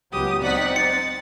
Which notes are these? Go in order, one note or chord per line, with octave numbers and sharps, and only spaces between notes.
C#2 F#3 B3 G4 D#6
C4 D#4 D5 F#5 B6
A6 C#7